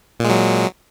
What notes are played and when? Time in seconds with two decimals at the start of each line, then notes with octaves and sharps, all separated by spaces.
0.20 A#2
0.25 G#3
0.29 F#3